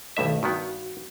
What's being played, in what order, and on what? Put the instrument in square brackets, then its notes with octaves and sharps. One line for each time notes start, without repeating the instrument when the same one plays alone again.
[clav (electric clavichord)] B1 G2 E5 [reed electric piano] D#3 A3 D#5
[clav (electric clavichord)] G2 D#3 B3 [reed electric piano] F#4